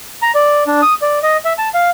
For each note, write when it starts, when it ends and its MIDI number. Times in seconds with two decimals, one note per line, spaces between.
0.22 0.32 82
0.35 0.64 74
0.67 0.81 62
0.82 0.94 87
1.02 1.19 74
1.23 1.37 75
1.45 1.53 76
1.58 1.69 81
1.74 1.90 77